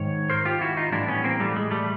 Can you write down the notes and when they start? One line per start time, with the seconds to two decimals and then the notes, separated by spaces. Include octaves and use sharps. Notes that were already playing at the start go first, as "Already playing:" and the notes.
Already playing: G#2 D#3 C#5
0.30 A#4 C5
0.45 F4 G4
0.61 E4 F#4
0.77 D#4 F4
0.92 A2 E3 G3 D4 E4
1.08 B3 C#4
1.24 A#3 C4
1.39 G3 A3
1.56 G#3
1.71 G3 A3